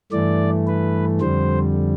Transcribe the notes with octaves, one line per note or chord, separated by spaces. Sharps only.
G2 E3 A3 D5
B4
F2 D3 G3 C5